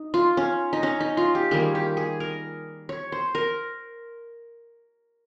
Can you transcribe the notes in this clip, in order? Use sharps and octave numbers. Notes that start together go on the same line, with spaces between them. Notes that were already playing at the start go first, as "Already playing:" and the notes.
Already playing: D#4
F4
C#4
D#4
C#4
D#4
F4
G4
D#3 G3 A#3 G#4
G4
G#4
A#4
C#5
C5
A#4